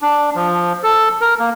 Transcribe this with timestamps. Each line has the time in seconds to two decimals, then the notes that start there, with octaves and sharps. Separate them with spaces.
0.02 D4
0.35 F3
0.83 A4
1.21 A#4
1.39 A#3